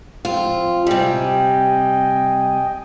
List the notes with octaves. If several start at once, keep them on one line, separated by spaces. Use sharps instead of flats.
F3 C4 F4
C3 G3 D#5 G5 G#5